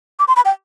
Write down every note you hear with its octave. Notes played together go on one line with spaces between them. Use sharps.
D6
C6
B5
G5